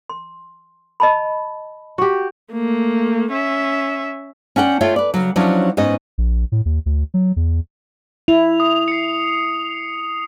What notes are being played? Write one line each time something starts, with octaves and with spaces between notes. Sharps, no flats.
C6
D#5 A5 B5
F#4 G4
A3 A#3
C#4 E5
C#4 D4 F#5 G5
A3 F4 C#5 E5 G5
B4 D5
C#3 F#3
F3 F#3 C#4 D4 E4
G#2 B3 C#4 D#4 D#5
A#1
A2
D#2
D2
F#3
E2
E4 F7
D#6
C7 C#7